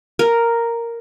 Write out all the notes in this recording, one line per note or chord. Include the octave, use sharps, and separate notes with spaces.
A#4